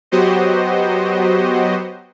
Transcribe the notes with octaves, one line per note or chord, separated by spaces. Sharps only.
F#3 B3 F#4 G4 C5 D#5